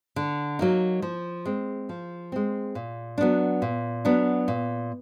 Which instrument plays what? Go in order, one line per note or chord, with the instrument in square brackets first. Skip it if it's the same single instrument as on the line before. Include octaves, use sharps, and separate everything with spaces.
[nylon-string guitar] D3
F#3 A#3 D#4
F3
G#3 C4
F3
G#3 C4
A#2
F#3 B3 D4
A#2
F#3 B3 D4
A#2